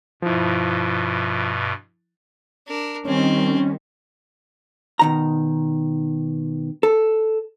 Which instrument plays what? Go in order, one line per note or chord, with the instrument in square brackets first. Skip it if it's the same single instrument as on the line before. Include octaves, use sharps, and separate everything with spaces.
[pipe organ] G2 B2 [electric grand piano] F3 E4
[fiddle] D4 A#4
[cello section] D#3 G3 [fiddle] C4 [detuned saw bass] C#4
[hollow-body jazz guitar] B2 D#3 A#5
A4